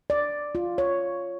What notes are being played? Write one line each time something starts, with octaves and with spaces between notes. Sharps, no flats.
D5
F4
C#5